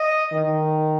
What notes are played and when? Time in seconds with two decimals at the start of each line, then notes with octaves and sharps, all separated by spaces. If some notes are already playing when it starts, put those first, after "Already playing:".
Already playing: D#5
0.33 D#3